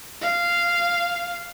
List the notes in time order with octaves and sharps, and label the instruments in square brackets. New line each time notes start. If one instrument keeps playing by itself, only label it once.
[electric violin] F5